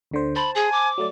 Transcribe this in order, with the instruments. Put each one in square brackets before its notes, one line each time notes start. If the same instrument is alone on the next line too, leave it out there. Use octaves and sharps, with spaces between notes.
[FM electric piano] D2 D3 C5
[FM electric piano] C5 A5 [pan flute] B5
[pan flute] G#4 [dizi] G#5
[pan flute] D6
[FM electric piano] F#3 A3 D5